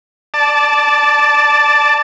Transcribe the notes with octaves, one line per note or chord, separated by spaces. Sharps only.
D5 A5